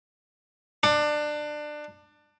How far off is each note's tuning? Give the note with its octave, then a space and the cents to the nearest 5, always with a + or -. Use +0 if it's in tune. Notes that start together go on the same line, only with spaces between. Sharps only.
D4 +20